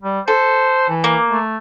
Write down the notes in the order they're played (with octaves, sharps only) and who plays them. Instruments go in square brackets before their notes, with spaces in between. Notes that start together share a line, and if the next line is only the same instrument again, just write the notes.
[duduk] G3
[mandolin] A4 [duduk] C5
[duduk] E3
[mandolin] A#3
[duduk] A3